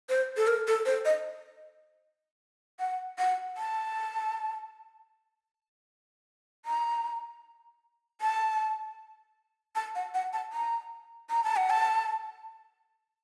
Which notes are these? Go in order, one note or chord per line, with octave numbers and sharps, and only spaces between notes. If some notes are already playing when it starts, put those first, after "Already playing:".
C5
A4
A#4
A4
C5
D#5
F#5
F#5
A5
A#5
A5
A5
F#5
F#5
A5
A#5
A#5
A5
F#5
A5